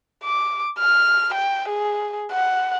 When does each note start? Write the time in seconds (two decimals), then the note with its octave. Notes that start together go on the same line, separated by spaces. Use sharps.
0.24 D6
0.79 F6
1.34 G5
1.68 G#4
2.32 F#5